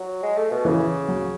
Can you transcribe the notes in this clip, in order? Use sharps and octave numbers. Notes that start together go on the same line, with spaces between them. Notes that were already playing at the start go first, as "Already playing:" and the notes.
Already playing: F#3
G#3
A3
B2
C#3 E3
F#3